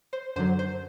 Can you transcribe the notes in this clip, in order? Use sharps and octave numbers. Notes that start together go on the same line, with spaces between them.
C5
F#2 D3 F#3 C5
C5